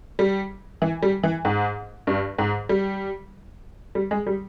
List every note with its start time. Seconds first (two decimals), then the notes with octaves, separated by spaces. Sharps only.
0.19 G3
0.82 E3
1.03 G3
1.23 E3
1.45 G#2
2.07 G2
2.38 G#2
2.69 G3
3.95 G3
4.11 G#3
4.27 G3